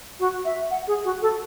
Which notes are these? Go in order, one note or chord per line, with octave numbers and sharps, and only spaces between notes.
F#4
E5
F#5
G#4
F#4
A4